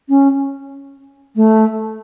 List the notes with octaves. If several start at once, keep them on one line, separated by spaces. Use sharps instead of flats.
C#4
A3